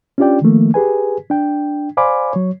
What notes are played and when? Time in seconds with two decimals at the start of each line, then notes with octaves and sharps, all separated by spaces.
0.18 C#4 D4 F4 G4 D5 G5
0.42 D#3 F3 A3 A#3
0.74 G4 G#4 B4 G#5
1.30 D4 G5
1.97 C5 D5 F5 G#5 B5 D6
2.33 F#3 C#5